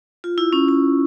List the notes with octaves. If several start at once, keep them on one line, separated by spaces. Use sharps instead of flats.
F4
E4
C#4
C#4